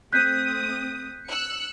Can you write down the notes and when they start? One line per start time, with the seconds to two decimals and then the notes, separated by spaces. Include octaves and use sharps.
0.13 A3 C4 D#6 F#6 G6 B6
1.26 E6 F#6 C#7